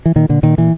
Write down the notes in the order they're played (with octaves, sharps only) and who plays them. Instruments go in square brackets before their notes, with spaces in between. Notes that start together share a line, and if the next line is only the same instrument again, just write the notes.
[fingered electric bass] E3
A#2 D#3
A#2 D3
A#2 D#3
A#2 E3